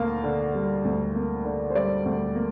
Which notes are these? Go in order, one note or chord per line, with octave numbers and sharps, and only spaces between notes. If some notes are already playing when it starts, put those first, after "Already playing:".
Already playing: D2 A#3 F5
D3
G3
D2
A#3
D3
C5
G3 D5
D2
A#3